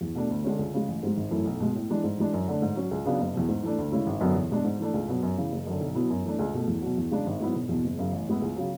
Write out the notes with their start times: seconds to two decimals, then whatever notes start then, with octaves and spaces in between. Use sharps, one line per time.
0.01 E2
0.15 B2 A3 D4
0.30 D2
0.44 D3 G#3 C#4
0.59 C#2
0.74 C#3 G#3
0.88 A1
1.03 G#2 G#3
1.17 G#1
1.31 F#2 E3 A3 E4
1.45 B1
1.60 B2 G#3
1.75 A2
1.90 E3 G#3 D4
2.04 G#2
2.18 E3 G#3 D4
2.33 F#2
2.48 D3 A3 D4
2.62 G#2
2.76 F#3 C#4
2.91 C#2
3.05 C#3 F#3 B3 D4
3.20 F#1
3.34 E2 B2
3.48 G#2
3.63 E3 A3 D4
3.78 D2
3.92 C#3 G#3 C#4 E4
4.06 G#1
4.21 F#2 D3 F#3 B3
4.35 E2
4.51 B2 G#3 D4
4.64 G#2
4.79 E3 A3 D4
4.94 C#2
5.08 B2 F#3 B3
5.23 F#2
5.37 C#3 E3
5.52 F#1
5.67 F#2 D3
5.81 B1
5.95 B2 F#3 B3 E4
6.10 F#2
6.24 E3 A3 D4
6.39 C#2
6.54 B2 A3
6.68 E2
6.82 B2 F#3
6.97 E2
7.11 C#3 G#3 D4
7.26 G#1
7.40 G#2 F#3 B3 E4
7.55 E1
7.69 E2 B2
7.84 F#1
7.99 F#2 C#3
8.12 A1
8.27 A2 G#3 B3 E4
8.42 C#2
8.56 C#3 F#3